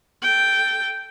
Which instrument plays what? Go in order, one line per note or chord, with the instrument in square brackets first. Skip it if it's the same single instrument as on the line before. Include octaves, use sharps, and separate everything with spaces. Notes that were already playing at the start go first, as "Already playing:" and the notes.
[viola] A4 G5